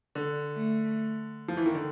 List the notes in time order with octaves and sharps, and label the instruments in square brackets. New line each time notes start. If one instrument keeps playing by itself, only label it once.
[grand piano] D3
[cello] A3
[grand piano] F3
E3
D#3
D3